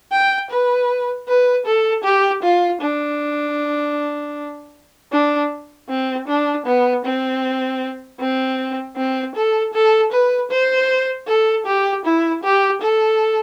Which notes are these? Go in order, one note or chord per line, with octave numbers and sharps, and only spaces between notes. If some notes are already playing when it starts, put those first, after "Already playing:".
G5
B4
B4
A4
G4
F4
D4
D4
C4
D4
B3
C4
C4
C4
A4
A4
B4
C5
A4
G4
E4
G4
A4